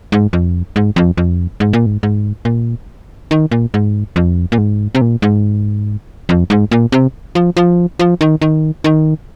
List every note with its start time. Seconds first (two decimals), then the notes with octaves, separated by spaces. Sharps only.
0.12 G#2
0.33 F2
0.76 G#2
0.96 F2
1.17 F2
1.60 G#2
1.73 A#2
1.86 G#2
2.03 G#2
2.45 A#2
3.31 D#3
3.51 A#2
3.74 G#2
4.16 F2
4.52 A#2
4.58 G#2
4.95 C3
5.01 A#2
5.22 G#2
6.29 F2
6.50 G#2
6.71 A#2
6.92 C3
7.35 F3
7.57 F3
7.99 F3
8.21 D#3
8.42 D#3
8.84 D#3